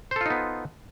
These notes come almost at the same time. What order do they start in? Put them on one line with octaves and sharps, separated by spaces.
C5 A4 F4 D#4 B3